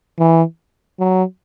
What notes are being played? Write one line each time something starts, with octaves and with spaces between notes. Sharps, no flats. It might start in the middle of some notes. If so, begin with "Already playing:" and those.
E3
F#3